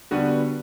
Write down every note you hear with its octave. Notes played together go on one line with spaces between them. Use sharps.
D3 G3 B3 F#4 B4